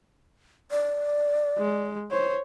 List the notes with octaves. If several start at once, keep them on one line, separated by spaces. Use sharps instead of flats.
D5
G#3
C5 C#5